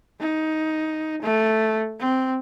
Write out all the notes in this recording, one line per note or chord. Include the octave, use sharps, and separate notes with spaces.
D#4
A3
C4